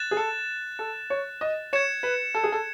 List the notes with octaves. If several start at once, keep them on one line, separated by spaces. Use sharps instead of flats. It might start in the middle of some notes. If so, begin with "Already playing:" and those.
Already playing: F#6 A6 E7
G#4
A4
A4
C#5
D#5
C#5 G#6 C#7 E7
B4
A4
G#4
A4